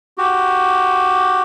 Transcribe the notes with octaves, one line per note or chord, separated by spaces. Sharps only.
F#4 G4